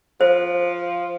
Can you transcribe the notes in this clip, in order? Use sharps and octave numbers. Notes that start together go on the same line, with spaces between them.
F3 C5